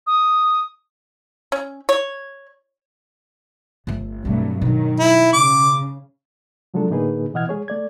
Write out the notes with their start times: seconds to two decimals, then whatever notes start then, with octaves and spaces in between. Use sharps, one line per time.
0.07 D#6
1.52 C#4
1.89 C#5
3.87 G1 A3
4.25 G2 B2 F#3 A3 C4
4.62 B2 D#3 F#3
4.99 E4
5.33 C#3 D6
6.74 C3 F3 F#3 G#3 D4 A4
6.90 A2 D3 A#3 D#4 G#4 B4
7.34 B2 E3 D#5 F#5 F6 G#6
7.49 G#3 G#4 C#5
7.68 A3 D5 G#6